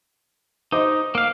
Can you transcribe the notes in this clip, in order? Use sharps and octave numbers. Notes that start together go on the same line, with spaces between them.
D#4 C5 D#5 D6
A#3 F5